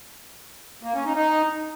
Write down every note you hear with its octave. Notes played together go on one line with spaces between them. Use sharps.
A#3
C#4
D#4
D#4